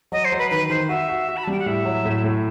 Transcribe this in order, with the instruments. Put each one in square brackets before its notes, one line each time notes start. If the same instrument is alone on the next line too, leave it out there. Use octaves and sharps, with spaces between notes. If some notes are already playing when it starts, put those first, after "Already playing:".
[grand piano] F#3 [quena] D#5
[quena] C5
[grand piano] F#3
[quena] B4
[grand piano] D#3 [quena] B4
[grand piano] D#3 [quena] C5
[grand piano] F#4 [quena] E5
[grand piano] F#4
F#4
[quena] B5
A5
[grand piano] G3 [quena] G5
[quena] F#5
[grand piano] A2 [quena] E5
[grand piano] F#3
A2
A2